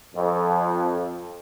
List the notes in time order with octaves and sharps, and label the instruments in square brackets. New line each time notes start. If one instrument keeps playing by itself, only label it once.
[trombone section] F2